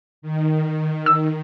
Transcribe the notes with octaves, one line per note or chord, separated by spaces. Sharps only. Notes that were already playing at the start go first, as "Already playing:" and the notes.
D#3
E6